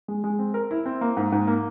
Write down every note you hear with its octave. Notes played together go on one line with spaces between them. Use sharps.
G#3
G#3
C4
A#4
E4
C4
A#3
G#2
G#2
A#3